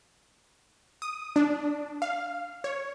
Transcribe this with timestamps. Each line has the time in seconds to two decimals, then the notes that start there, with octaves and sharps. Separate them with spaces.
1.02 D#6
1.36 D4
2.02 F5
2.64 C#5